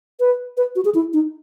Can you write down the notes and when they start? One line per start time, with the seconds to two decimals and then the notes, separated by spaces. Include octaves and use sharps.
0.20 B4
0.57 B4
0.76 F#4
0.85 G#4
0.95 E4
1.13 D#4